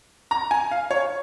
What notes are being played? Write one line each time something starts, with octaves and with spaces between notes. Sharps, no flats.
A#5
G#5
F5
C#5